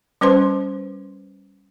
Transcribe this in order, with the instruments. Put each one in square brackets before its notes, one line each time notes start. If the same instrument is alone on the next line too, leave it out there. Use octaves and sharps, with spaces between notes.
[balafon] G3 C#4 B4 C5 C6